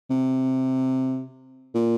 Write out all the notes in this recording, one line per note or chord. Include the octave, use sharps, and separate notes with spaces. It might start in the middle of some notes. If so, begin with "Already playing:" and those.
C3
A#2